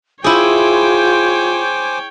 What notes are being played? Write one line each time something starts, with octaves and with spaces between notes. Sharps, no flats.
E4 F4 G#4 C5 C#5 G5 G#5 D6